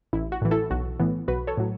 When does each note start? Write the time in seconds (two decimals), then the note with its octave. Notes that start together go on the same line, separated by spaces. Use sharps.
0.13 A1 E4
0.32 F#4
0.42 A2 E3
0.51 E4 A4
0.70 B1 F#4
0.99 A2 E3 B3
1.28 B1 F#4 B4
1.47 A4 C#5
1.58 A2 F#3